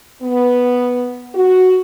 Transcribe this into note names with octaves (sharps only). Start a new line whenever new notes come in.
B3
F#4